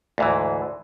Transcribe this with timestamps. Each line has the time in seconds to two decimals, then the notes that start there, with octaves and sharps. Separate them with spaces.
0.18 D2 G#2 E3